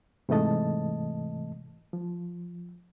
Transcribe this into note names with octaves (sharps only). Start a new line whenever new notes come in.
G#2 C3 E3 A3 D#5 A5
F3